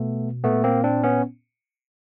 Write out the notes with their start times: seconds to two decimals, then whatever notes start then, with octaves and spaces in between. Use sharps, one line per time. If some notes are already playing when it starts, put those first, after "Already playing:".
Already playing: B2 A3 B3
0.44 A#2 A3 B3
0.64 A#3 C4
0.84 C4 D4
1.03 B3 C#4